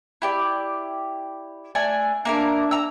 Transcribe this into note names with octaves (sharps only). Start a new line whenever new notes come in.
E4 G4 D5
A3 D4 G#5
A#3 D4 E4 A#4
A#5 E6